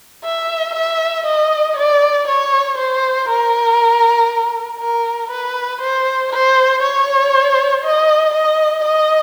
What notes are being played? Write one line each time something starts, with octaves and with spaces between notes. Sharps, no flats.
E5
E5
D#5
D5
C#5
C5
A#4
A#4
B4
C5
C5
C#5
D#5
D#5
D#5